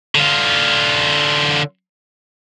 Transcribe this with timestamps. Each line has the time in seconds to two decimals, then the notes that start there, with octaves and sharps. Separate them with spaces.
0.15 D3 F4